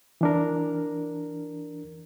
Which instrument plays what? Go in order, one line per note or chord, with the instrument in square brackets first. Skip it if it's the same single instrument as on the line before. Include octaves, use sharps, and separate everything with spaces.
[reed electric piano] E3 D4 A#4